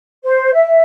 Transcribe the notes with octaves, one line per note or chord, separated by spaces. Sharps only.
C5
E5